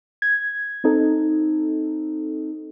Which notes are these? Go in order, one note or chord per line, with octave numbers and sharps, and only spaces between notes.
G#6
C4 D#4 A4